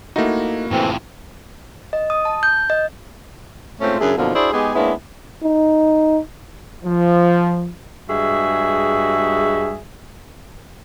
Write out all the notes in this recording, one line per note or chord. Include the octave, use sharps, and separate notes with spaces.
A3 A#3 D#4 E4 F#4
F2 A2 E3 C4
D#5
D#6
A5
G6
D#5
G#2 A3 C4 C#4 F4
F#2 C#3 D4 E4 G#4
F#2 B2 D3 F3 A#3 D#4
D4 E4 F#4 G#4 C5 D5
G#3 B3 D#4 G4 G#4
G#3 A#3 B3 C#4 D4 E4
D#4
F3
G2 G#3 F#4 G#4 E5